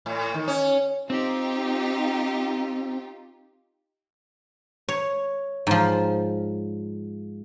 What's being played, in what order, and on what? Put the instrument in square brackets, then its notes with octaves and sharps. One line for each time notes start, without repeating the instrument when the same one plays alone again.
[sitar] A2
D#3
C#4
[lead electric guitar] C4 [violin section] D#4 F4 G4
[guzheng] C#5
G#2 F3